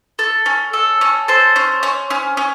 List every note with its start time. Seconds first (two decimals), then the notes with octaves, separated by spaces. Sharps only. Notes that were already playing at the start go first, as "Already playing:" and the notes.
0.19 A4
0.46 C#4
0.73 A4
1.01 C#4
1.28 A4 C5
1.56 C#4
1.83 C#4
2.10 C#4
2.37 C#4